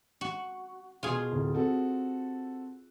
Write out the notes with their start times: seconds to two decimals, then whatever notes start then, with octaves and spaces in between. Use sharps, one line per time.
0.21 F#4
1.03 B2 F4 G#4
1.32 D1
1.54 C4 F#4 A4